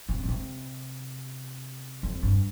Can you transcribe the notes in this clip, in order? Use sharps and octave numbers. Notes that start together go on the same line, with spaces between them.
C3
B2
C3
F2
G2